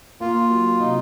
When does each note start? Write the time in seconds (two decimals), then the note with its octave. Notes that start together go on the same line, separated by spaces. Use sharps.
0.20 A#3 F4
0.50 F#3
0.80 C3 D#4